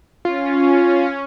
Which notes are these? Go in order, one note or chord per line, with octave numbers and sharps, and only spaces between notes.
C#4 F4